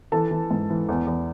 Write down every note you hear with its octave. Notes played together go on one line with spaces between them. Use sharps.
E3 A4 A5
E3
G#2
E3
E2
E2